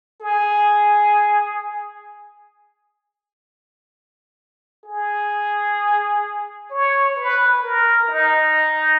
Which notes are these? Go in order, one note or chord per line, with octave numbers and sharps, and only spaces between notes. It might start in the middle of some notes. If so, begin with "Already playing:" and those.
G#4
G#4
C#5
B4
A#4
D#4